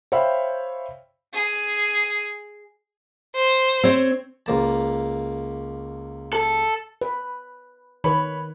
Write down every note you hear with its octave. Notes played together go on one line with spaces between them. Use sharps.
C5 C#5 E5 F5 G5 B5
G#4
C5
C4 C#5
C#2 A#3 A5
A4
B4
D#3 B4 C#5 B5